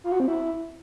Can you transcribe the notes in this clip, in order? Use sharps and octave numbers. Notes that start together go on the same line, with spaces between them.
F4
F#4
C4
E4